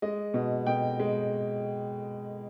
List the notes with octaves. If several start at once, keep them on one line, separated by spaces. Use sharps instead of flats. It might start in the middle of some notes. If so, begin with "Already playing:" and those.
G#3 D#5
B2
B2 G5
G#3